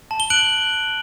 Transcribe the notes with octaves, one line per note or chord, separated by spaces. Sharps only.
A5
G7
F#6 D7 F#7